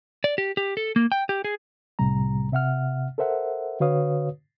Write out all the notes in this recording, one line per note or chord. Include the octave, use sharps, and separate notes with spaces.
D5
G4
G4
A4
A#3
G5
G4
G#4
C2 A2 C3 G3 A#5
C3 E5 F#5 F6
A4 A#4 C5 E5 F#5
D3 F#4 B4 C#5 F5 D#6